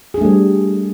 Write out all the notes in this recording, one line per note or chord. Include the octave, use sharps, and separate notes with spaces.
G3 A3 D4 G#4